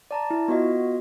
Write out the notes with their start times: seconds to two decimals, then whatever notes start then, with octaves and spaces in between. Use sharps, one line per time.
0.11 D5 A5 A#5
0.30 E4
0.48 B3 F4 F#4 D#5